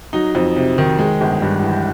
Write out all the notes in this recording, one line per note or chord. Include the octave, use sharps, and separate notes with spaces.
F#3 D#4
F2
C3
D#3
G#3
G1
G2
E3